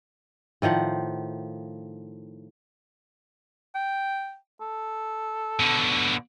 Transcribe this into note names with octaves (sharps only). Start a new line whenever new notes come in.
A2 D#3 F3 F#5
G5
A4
B2 D3